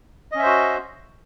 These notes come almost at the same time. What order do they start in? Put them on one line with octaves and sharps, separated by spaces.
D#5 C#4 E5 C5 F#4